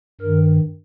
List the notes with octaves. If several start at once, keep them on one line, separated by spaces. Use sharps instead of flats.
G2 D#3 A#4